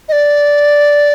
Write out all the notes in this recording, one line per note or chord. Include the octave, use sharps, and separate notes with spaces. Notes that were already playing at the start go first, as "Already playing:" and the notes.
D#5
D5